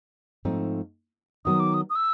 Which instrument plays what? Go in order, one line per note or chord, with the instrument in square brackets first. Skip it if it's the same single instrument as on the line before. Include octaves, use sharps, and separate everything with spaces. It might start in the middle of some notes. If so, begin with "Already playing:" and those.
[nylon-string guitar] G#2 F3 A3 C4 D#4
[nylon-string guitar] D#3 F#3 B3 D#4 [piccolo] D#6
[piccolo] D6
D#6
D#6
E6